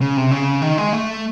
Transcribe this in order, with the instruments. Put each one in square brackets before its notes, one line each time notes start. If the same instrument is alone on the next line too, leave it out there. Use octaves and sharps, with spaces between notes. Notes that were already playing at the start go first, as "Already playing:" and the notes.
[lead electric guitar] C#3
C3
C#3
D#3
G#3
A3